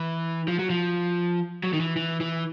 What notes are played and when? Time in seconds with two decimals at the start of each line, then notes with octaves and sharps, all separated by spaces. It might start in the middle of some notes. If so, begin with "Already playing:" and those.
Already playing: E3
0.48 F3
0.59 F#3
0.70 F3
1.63 F#3
1.73 D#3
1.80 E3
1.96 E3
2.21 E3